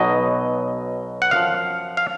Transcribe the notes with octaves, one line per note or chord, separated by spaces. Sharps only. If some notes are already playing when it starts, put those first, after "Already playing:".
Already playing: B1 B2 F#3 D#5
F#5
F#2 F3 F5
F5